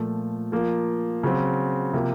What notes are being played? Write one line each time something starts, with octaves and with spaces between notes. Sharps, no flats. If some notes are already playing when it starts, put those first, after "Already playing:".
Already playing: A#2 F3 A3
F3 A#3 F4
C#3 F#3 C4
C3 F3 A#3